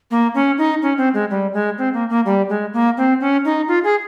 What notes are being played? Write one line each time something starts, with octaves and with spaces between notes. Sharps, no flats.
A#3
C#4
D#4
C#4
C4
G#3
G3
G#3
C4
A#3
A#3
G3
G#3
A#3
C4
C#4
D#4
F4
G#4